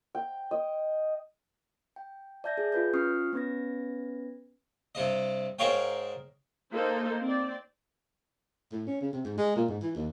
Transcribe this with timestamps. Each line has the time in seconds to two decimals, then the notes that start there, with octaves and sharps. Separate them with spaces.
0.15 G5
0.51 D#5
1.96 G5
2.44 D5 E5 A5 G6 G#6 A#6
2.58 G#4
2.72 F4 B4 G6
2.93 C#4 F4 C#6 D#6 F6 C7
3.33 B3 C#4 B4 G#6 A#6
4.95 G2 C3 D#5
5.59 G#2 G#4 A#4 C#5 F5 G5
6.72 A#3 D#4 A4 C5
7.21 C4 D5
8.72 A2
8.87 C#4
9.01 C#3
9.13 C3
9.24 G#2
9.37 G#3
9.56 A#2
9.68 G#2
9.82 E3
9.95 D#2